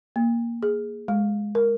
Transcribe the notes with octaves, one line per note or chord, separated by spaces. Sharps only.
A#3
G#4
G#3
A#4